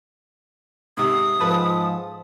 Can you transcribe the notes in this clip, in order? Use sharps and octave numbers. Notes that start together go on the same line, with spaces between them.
G#2 C3 D#6
G#2 F3 A4 B4 A5